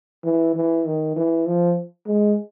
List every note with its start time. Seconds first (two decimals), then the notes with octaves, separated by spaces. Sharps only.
0.24 E3
0.56 E3
0.86 D#3
1.16 E3
1.46 F3
2.07 G#3